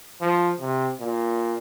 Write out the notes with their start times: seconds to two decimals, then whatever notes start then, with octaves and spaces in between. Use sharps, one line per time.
0.21 F3
0.60 C3
1.00 A#2